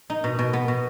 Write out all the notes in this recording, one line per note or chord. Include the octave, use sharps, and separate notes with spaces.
D#4
B2
B2
B3
B2